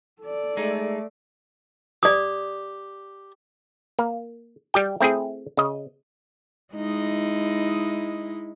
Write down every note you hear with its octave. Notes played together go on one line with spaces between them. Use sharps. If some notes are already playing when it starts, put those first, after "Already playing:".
A4 D5
G#3 A3 D#4
G4 D5 D#6
A#3
G3 G4 G5
A3 C4 E4 G#4
C#3 D#5
G#3 D#4 E4